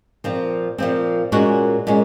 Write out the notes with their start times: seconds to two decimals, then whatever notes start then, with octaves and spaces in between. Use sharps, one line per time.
0.24 A#2 F3 C4
0.78 A#2 F3 C4
1.32 A#2 G#3 C#4 F#4
1.87 A#2 G#3 C#4